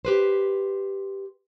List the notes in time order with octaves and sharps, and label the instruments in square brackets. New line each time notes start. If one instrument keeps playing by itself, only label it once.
[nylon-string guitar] G4 B4 C5